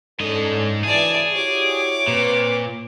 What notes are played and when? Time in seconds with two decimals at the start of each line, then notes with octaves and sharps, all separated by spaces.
0.20 G#2 C#4 D4 A4 D#5
0.84 D2 C#3 E3 G#4 D5 A5
1.33 E4 F#4 G4 C#5 D6
2.07 A#2 C4 B4